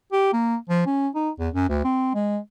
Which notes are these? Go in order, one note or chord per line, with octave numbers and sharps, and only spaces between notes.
G4
A#3
F3
C#4
D#4
E2
F#2
D2
C4
G#3